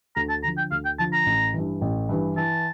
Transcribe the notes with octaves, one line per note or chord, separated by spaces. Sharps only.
D2 A#5
A5
D3 F3 A#5
G5
D2 F5
G5
D3 F3 A5
A#5
A1
G2 E3
A1
G2 E3
E3 A5